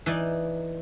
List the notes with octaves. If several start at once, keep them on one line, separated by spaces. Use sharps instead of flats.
E3 D#4 D5